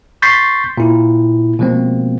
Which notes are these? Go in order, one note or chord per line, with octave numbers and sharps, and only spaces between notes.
C6 C#6 G6 A6 B6 C7
A#2 E4
B2 F3 G#3 A#3 C4